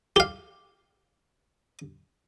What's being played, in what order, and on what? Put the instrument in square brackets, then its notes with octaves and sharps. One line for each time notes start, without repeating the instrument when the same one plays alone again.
[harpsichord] G4 F5